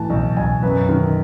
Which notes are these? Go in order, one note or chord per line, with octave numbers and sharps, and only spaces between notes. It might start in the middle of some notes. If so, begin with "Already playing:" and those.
Already playing: A2 E3 A5
B1
B1 G#5
F#2 B4
D#3